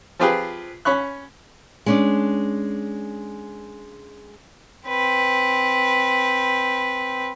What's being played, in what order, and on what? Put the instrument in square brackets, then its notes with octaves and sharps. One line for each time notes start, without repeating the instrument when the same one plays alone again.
[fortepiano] F3 C4 F4 G4 G#4 B4
C#4 B5 C#6 F#6
[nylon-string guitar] G#3 C#4 D4
[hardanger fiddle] C4 B4